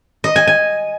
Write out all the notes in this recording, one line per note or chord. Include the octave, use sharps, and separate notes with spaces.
D#5
G#5
G#5